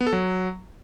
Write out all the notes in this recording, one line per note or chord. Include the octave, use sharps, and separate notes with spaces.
B3
A4
F#3